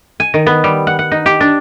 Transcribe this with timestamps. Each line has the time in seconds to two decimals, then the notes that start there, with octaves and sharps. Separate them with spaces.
0.20 G#5
0.34 D#3
0.46 B3
0.64 G3
0.87 F#5
0.99 F#5
1.11 D#4
1.26 G4
1.40 D4